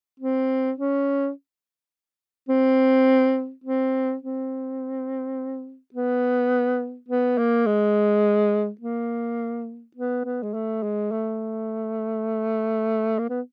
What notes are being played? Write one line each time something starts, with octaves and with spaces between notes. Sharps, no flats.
C4
C#4
C4
C4
C4
B3
B3
A#3
G#3
A#3
B3
B3
G#3
A3
G#3
A3
A#3
B3